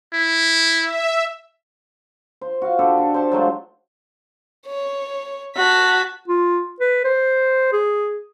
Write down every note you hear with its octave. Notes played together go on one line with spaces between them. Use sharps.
E4
E5
C5
F#4 F5
D3 G4 A4
D4 C#6
C5 A5
F#3 G#3 A3 F4
C#5
F#4 A5 B6
F4
B4
C5
G#4